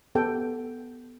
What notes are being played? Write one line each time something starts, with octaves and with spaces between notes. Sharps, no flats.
B3 G4 A4 G5